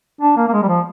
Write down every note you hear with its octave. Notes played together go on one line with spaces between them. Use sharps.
D4
A#3
A#3
G#3
G3
F3